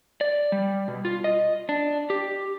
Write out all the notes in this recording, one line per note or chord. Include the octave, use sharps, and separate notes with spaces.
D5
G3
B2
F4
D#5
D4
G4